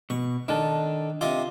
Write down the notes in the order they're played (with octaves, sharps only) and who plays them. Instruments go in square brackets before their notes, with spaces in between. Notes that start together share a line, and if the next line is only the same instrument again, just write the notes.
[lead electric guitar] B2 [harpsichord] C#6
[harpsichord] D#3 [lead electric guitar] D4 A4
[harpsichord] C3 D#5 D6 [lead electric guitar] F4